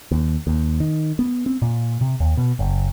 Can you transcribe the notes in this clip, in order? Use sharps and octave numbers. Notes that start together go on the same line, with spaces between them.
D#2
D#2
D#3
B3
C4
A#2
C3
D#2
B2
F#1